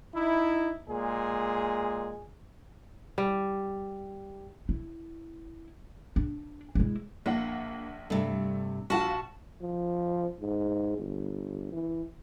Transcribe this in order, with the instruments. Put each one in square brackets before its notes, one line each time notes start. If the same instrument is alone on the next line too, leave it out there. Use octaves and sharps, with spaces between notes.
[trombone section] D#4 E4
A#2 G#3 G#4
[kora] G3
[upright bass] E4
D4
G#3 E4
[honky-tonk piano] A#1 D4 F#5 [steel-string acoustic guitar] A#3
[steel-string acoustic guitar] G2 C3 [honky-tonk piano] A3
[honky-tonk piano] A#1 F4 F#5 [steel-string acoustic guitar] F#4 A5
[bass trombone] F3
G#2
G1
E3